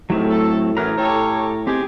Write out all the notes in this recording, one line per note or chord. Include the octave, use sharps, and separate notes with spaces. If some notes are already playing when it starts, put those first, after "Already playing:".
F#2 A2 C3 D#3 F#3 A3 C4
A4
F#2 E3 A#5 F6
A2 G4 A4 C#5
C4 D#4 G4 G#4